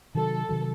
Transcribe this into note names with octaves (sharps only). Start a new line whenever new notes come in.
C3 D#3 F#3 A4
C3 D#3 F#3